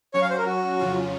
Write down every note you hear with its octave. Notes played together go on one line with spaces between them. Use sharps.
F#3 C#4 F#4 C#5
F5
C5
A#4
F#4
F2 C#3 F#3 C#4 F4